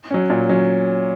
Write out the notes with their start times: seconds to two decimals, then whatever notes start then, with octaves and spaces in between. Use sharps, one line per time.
0.11 F#3 C#4
0.30 A#2
0.49 F#3 C#4